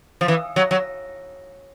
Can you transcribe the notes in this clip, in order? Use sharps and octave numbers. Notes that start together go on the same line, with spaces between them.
F3
E3
F#3
F#3